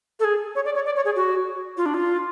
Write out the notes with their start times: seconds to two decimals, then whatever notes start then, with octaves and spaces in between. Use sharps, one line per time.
0.20 A4
0.24 G#4
0.55 C#5
0.65 D5
0.75 C#5
0.86 D5
0.96 C#5
1.05 G#4
1.16 F#4
1.77 F4
1.86 D4
1.94 F4